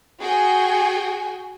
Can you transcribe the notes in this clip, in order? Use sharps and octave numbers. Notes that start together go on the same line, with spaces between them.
F#4 G#4 G5 G#5